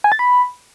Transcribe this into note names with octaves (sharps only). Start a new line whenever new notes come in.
G#5
A6
B5